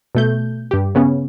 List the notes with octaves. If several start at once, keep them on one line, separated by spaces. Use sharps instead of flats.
B2 A3 G6
G2 G4
C#3 B3 C#4